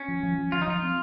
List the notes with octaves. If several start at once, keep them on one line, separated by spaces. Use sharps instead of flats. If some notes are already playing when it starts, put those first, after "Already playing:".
Already playing: C#4
F3
F3
F3
F3 F4
D#4
F3 F4
C4